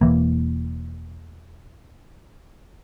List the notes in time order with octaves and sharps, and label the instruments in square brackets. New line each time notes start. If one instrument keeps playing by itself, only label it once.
[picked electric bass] E1 E2 E3 A#3